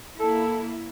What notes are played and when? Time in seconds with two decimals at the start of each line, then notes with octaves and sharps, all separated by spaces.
0.19 A#3 E4 A4